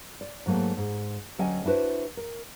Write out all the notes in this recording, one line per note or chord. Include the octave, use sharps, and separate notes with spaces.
D5
G#2 F#3 A3 A#3
G#2
D2 F#3 C#4 D#5 G5 G#5
D4 E4 F#4 B4 C5
A#4